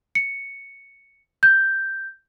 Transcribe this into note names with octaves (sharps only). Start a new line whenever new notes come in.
C#7
G6